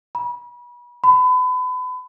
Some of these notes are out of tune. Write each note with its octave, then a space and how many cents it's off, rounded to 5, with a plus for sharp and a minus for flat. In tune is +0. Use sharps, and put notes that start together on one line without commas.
B5 -35
B5 +35